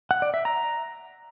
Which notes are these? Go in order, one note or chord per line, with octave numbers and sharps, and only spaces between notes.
F#5
D5
E5
A#5